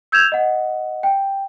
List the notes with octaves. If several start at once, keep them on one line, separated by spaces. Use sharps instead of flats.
E6 G6 G#6 E7 F7
D#5 F#5
G5